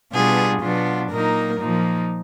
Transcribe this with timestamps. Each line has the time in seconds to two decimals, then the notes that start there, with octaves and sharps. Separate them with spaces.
0.12 B2 G3 B3 D4 F4 G#4
0.61 B2 F#3 B3 D4 F4
1.10 A#2 F#3 A#3 D#4 A#4
1.59 A#2 F3 A#3 D#4